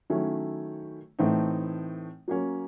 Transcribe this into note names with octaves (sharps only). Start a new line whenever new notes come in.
D#3 F#3 A3 C#4 E4
A2 E3 A3 C4 D#4
F#3 A#3 C#4